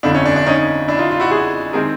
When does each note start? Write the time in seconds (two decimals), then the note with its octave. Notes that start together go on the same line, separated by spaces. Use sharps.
0.03 G1 F2 D3 D4 E4
0.15 C#4
0.26 D4
0.36 D4
0.46 C#4 D#4
0.88 D4 E4
0.99 D#4 F4
1.11 F4
1.20 E4 F#4
1.31 F#4 G#4
1.73 D#3 G#3 C4 G#4 A#4